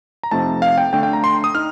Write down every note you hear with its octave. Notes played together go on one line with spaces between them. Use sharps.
A#5
F2 C3 F3 A3 D#4 A5
F5
G5
D3 A3 D4 G5
G5
A#5
C6
D#6
D#4 F6